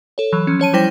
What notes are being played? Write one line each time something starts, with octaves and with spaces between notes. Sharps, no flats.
A4 C#5
E3 F#3
F3 C#4
C#4 C#5 A5 D#7
F3 G3 E4 C5 G5 A#6